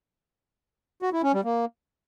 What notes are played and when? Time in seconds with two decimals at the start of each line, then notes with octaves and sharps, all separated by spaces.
1.02 F#4
1.13 E4
1.23 C#4
1.34 G3
1.44 A#3